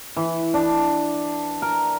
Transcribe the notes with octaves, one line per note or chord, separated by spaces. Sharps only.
E3
D4
A#4